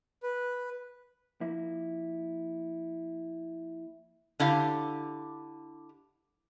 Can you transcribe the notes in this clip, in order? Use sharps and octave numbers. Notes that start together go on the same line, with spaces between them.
B4
F3 A#3 E4
D3 E4 G4 F5